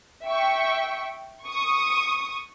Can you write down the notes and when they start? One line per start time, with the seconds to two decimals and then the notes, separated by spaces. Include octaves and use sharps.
0.25 E5 G5 C#6
1.47 C#6 D#6